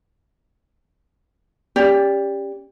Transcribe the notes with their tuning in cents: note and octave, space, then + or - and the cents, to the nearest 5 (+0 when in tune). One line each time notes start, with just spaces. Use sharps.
C#4 +0 G4 +20 D5 -10